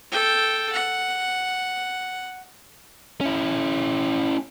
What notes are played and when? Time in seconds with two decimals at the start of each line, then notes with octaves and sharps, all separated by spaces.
0.12 A4 G5
0.72 F#5
3.21 C#4 E4